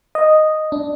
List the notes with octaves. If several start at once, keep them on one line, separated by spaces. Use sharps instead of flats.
D#5
D4